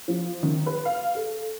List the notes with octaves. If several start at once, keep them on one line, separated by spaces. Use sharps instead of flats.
F3
D#3
B4
F5
A4